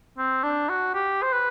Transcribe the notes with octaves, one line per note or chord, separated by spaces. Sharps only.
C4
D4
F#4
G4
C5
B4